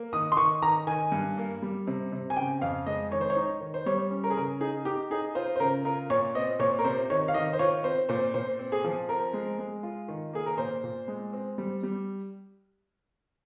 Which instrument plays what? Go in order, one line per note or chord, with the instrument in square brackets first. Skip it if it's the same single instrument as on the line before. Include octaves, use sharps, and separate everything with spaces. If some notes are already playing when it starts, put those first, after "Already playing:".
Already playing: [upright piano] A#3
D#3 D#6
C6
D#3 C#6
D#3 A#5
D#3 G#5
G2
A#3
G3
C3
C3
G#5
C#3 G5
F2 F5
G#3 D#5
D#3 C#5
C5
C#5
D#4
D#3
C5
G3 C#5
C#4
A#4
G#4
C#3 A#4
D#4 G#4
D#4 G4
D#4 G#4
F4 C5
C5
C#3 A#4
F4 A#4
A#2 C#5
C4 D#5
A#2 C#5
A#4
C3 C5
D#3 C#5
F5
D#3 D#5
C5
F4 C#5
C4 C5
A#2 C5
A#2 C5
C4
G#4
F3
C4 A#4
G#3
G#3
F4
D#3
A#3 G#4
A#4
A#2 C5
A#2
G#3
C4
G3
G3